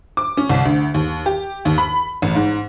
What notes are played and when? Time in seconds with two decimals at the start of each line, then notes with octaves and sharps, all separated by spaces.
0.17 D6
0.37 C#4
0.50 C2
0.65 D2
0.94 D#2
1.26 G4
1.65 D#2
1.78 B5
2.22 A1
2.35 G#2